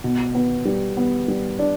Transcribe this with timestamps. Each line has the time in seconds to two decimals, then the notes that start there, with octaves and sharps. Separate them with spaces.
0.04 B2
0.35 B3
0.65 G3
0.97 B3
1.28 G3
1.59 D4